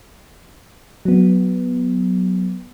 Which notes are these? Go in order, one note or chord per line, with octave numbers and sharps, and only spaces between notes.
F#3 B3